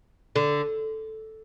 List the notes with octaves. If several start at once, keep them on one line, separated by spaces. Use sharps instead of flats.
D3